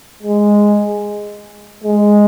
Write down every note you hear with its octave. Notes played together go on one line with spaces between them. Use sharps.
G#3
G#3